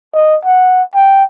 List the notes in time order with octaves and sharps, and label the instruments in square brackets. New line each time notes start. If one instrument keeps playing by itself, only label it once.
[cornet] D#5
F#5
G5